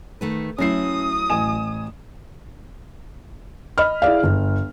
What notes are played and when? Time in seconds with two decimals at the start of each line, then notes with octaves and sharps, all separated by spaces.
0.21 D#3 A3 B4
0.58 F#3 A3 C#4 E4 D#6 C7
1.30 A1 G#5 E7
3.78 D#5 B5 F6
4.02 E4 G#4 D5 F5
4.23 G1